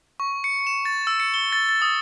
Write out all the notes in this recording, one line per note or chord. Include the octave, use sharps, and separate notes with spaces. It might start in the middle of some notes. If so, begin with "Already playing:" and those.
C#6
C#7
E7
A6
E6
C#7
G7
A6
A6
D#6